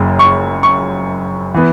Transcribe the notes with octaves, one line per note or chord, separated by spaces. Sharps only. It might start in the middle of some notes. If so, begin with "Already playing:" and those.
Already playing: F#1 F#2 C#3
C#6
C#6
E3 B3